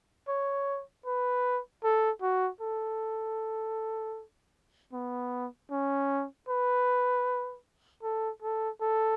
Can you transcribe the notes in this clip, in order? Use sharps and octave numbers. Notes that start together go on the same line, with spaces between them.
C#5
B4
A4
F#4
A4
B3
C#4
B4
A4
A4
A4